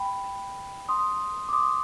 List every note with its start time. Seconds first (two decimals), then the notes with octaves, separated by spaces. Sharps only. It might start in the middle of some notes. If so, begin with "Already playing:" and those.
Already playing: G5 B5
0.89 C6 D#6
1.49 D6
1.53 C6 D#6